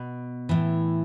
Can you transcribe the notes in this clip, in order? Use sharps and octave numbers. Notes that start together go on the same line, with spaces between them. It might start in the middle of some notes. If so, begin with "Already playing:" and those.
Already playing: B2
A2 E3